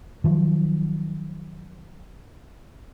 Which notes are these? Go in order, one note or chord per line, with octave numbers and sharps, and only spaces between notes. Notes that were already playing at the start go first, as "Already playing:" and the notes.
D#3 F3 F#3